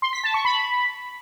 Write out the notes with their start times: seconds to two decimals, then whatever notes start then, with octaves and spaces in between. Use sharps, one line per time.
0.02 C6
0.13 B6
0.23 A5
0.34 C#6
0.45 B5